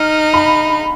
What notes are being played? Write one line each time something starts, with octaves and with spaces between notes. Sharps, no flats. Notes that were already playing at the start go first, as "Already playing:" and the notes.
Already playing: D#4 F6
B5